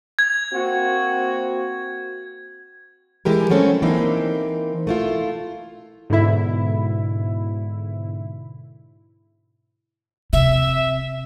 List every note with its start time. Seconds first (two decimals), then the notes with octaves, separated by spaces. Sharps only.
0.19 G#6
0.51 A#3 C4 F#4
3.25 E3 G#3 G4 A#4
3.50 F#3 A3 C4 C#4 A4
3.82 E3 A#3 C4 D#4
4.87 A3 E4 F4
6.10 G#2 B2 D3 E4 E5
10.33 C3 E5